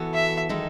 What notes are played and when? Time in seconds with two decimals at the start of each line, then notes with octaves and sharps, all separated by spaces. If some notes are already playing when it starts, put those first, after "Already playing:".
Already playing: E3 B3 F#4 A4
0.14 E5
0.49 D#3 G#3 D#4 A4